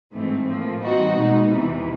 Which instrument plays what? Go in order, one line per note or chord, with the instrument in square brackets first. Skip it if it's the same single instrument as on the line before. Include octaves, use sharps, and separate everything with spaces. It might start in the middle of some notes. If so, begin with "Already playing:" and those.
[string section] G#2 E3 A3 C4
A2 F3 A#3
E3 G3 C4 D#4 F#4
B2 G#3 B3 D#4
E2 C3 E3